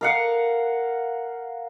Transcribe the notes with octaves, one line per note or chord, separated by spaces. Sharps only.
A#4 F5 F#5